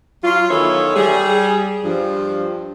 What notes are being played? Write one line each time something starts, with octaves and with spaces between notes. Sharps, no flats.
F#3 F4
D#3 E3 B3 A4 C#5 E5
G3 G#4
G2 F3